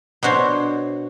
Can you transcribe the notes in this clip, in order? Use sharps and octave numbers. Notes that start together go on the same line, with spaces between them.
B2 D4 F#4 C5 C#5